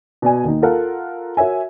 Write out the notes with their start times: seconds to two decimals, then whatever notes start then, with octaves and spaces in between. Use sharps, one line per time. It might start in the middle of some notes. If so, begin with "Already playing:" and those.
0.22 B2 D5 G#5
0.44 D#2 D#4
0.62 F4 A4 A#4 F#5
1.37 F#4 A#4 C#5 E5 G#5